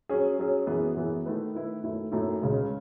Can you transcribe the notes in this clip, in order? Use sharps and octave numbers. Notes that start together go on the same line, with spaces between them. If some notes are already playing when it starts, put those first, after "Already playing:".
F#3 C#4 G#4
F#3 C#4 G#4
F#2 E3 B3 E4 G#4
F#2 E3 B3 E4 G#4
D#3 A3 E4 B4
D#3 A3 E4 B4
F#2 D#3 A3 E4
F#2 D#3 A3 E4
C#2 C#3 G#3